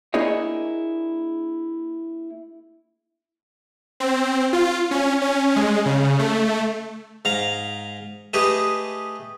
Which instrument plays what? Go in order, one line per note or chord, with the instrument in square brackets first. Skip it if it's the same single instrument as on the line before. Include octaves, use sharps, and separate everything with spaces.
[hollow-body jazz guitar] A#3 D4 E4 G#4 C#5 D#5
[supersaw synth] C4
F4
C#4
C#4
G#3
C#3
A3
[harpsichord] G#2 F5 A#5
A3 G4 G#4 B4 D#5